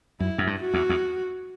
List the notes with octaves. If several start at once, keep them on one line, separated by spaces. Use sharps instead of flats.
F#2 E4
F#2
G2
F#4
E2
E2